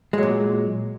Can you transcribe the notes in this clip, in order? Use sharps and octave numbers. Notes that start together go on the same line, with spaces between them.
A#2 F#3 G#3